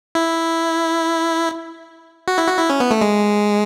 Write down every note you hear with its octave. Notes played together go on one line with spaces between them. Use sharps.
E4
F#4
E4
F#4
E4
C#4
B3
A3
G#3